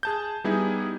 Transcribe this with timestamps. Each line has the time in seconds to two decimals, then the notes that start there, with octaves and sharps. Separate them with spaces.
0.03 G#4 A5 G6
0.44 G3 B3 D#4 E4 G#4